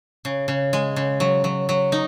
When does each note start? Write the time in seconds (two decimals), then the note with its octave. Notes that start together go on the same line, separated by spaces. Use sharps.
0.25 C#3
0.48 C#3
0.73 G#3
0.96 C#3
1.20 F#3
1.44 F#3
1.69 F#3
1.92 D#4